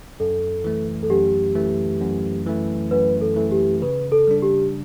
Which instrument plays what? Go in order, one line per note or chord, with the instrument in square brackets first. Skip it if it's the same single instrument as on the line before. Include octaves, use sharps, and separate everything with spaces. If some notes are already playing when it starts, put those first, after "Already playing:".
[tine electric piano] F#2 [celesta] A4
[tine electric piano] E3 A3
[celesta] A4
[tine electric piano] F#2 [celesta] G4
[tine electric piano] E3 A3
F#2
E3 A3
[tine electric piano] F#2 [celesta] B4
[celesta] A4
[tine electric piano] E3 A3
[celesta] G4
[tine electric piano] C#3 [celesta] B4
[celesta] A4
[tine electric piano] G3 D4
[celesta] G4